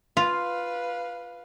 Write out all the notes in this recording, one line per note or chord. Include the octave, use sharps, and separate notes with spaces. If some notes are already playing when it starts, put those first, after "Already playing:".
F4 B4 F5